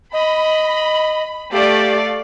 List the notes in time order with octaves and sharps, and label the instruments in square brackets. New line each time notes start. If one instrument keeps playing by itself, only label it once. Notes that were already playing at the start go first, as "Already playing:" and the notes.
[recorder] D#5 [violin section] B5
[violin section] A3 D5 F5 [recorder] G4